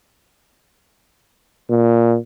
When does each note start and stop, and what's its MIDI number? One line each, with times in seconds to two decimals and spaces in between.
1.70 2.17 46